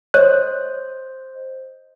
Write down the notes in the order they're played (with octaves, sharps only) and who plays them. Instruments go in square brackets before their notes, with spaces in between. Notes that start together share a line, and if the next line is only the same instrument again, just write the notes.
[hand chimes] C5 D#5 G6 [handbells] C#5 F#6